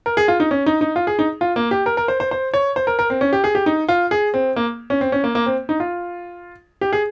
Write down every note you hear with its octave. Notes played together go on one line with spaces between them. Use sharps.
A#4
G#4
F4
D#4
C#4
D#4
D#4
F4
G#4
D#4
F4
A#3
G4
A#4
A#4
C5
C5
C5
C#5
C5
A#4
A#4
C4
C#4
G4
G#4
G4
D#4
F4
G#4
C4
A#3
C#4
C4
C#4
A#3
A#3
C4
D#4
F4
G4
G#4